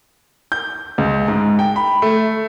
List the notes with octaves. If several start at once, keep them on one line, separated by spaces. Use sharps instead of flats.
G6
C#2
G#2
G5
B5
A3